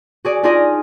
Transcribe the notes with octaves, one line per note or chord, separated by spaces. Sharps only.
F#4 G#4 D5
D4 D#4 F4 G#4 D5 D#5